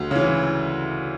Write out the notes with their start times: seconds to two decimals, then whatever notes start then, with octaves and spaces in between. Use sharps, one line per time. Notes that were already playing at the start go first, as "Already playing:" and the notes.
Already playing: D2
0.11 C#3 E3